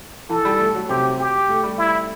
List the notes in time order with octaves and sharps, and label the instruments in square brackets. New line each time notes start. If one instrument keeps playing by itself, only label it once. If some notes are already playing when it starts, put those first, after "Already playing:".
[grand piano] E3 [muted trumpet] A4
[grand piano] G3
A3
F#3
[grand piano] C3 [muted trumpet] G4
[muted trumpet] G4
[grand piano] A3
G3
[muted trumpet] E4